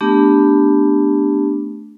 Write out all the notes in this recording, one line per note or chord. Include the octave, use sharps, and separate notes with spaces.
A3 B3 D4 G4